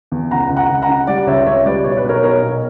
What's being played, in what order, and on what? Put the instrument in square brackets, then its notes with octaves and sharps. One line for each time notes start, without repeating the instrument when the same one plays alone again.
[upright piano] E2
C#2 F#5 A#5
C#2
F#5 A#5
C#2
F#5 A#5
C#3
G3 D5 F#5
C#2 C#5 E5
C#2 C#5 E5
G3 B4 D5
B1 C#5
B4
B1
A#4 C#5
B1 A#4 C#5
B2